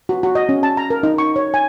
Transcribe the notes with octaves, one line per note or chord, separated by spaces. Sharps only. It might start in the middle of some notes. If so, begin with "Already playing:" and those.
F#4
F#4
D#5
C#4
A5
A#5
A#4
D#4
C#6
C#5
G#5